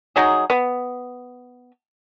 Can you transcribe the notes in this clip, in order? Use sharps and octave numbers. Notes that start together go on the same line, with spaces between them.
F#3 D#4 G#4
B3